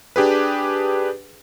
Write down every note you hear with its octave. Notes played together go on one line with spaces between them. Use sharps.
D4 G4 G#4 B4